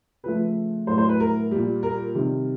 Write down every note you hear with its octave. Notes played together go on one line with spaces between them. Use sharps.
C#3 F3 A3 B4
A2 F#3 A3 C5
C5
B4
A#4
A#2 G3
A#4
C3 D#3 G3